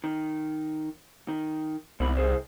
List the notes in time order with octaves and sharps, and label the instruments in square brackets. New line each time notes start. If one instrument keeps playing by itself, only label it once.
[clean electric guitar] D#3
D#3
[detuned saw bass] C2 [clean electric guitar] G#2 B2 B5
[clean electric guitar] G#4 C5